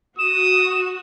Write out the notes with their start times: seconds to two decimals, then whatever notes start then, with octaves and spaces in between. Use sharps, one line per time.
0.19 F#4 D#6 E7